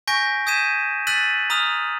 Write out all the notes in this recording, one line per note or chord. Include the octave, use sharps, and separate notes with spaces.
G#5 C#6 G6 A#6 B6 D7
D#6 G6 G#6 B6 D#7 E7
E6 F#6 A6 B6 D#7 F#7
A#5 D#6 F6